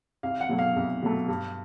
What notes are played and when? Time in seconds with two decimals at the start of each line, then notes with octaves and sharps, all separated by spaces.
0.23 C2 F5
0.41 F#5
0.49 B2 F#3 A3
0.59 F5
0.76 C2
1.02 B2 F#3 A3
1.28 G2